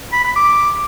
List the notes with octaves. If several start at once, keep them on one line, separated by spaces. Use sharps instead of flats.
B5
B5
D6